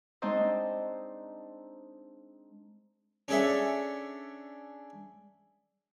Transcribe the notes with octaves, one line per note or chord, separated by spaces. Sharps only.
G#3 C4 D4 D#4 C5 D#5
C#4 D4 G#4 A4 E5